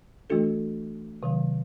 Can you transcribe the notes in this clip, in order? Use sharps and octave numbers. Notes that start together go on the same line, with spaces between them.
E3 A3 D4 F#4 A4
C3 D#3 F#3